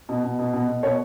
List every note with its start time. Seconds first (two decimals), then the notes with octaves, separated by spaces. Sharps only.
0.09 B2
0.24 B2
0.39 B2
0.53 B2
0.68 B2
0.83 B2 C#5